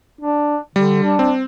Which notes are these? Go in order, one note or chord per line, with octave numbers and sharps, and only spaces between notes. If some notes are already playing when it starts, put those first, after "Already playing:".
D4
D3 G3
D4
C4